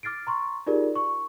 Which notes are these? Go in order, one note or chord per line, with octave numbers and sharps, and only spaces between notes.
D6 F6 A6 C7 D7
A#5 C6 C#6
D#4 F4 G4 G#4 A#4 D5
C#6